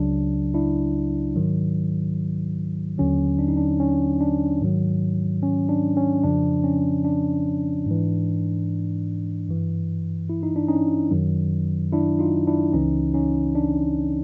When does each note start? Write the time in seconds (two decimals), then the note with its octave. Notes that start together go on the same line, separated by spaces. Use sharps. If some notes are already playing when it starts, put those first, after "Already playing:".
Already playing: C#2 C#3 F#3 D4
0.54 D4 E4
1.36 G#2 D#3 F#3
2.98 D#2 D3 F#3 C#4
3.39 D4
3.48 D#4
3.57 D4
3.80 C#4
4.20 D4
4.61 G#2 D#3 F#3
5.43 C#4
5.69 D4
5.97 C#4
6.23 F2 C#3 F3 D4
6.64 C#4
7.05 D4
7.86 G#2 E3
9.49 G2 E3
10.30 E4
10.43 D#4
10.56 D4
10.68 C#4 D#4
11.11 F#2 D#3 F#3
11.93 D4 E4
12.19 D#4 F4
12.47 D4 E4
12.73 C#2 C#3 E3 C#4 D#4
13.14 C#4 D#4
13.55 D4